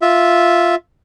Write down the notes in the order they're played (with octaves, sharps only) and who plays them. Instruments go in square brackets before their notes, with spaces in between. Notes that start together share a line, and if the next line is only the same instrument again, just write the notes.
[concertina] F4 E5